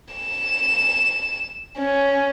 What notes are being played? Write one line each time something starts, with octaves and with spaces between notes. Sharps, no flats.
E7
C#4